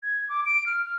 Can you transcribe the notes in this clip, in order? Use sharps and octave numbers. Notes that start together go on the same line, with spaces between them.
G#6
D6
D7
F6
F6